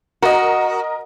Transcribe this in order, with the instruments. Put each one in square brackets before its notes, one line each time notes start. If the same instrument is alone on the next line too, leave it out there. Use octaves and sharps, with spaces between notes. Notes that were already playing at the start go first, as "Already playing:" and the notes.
[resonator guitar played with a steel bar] F#4 [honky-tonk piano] A#4 D#5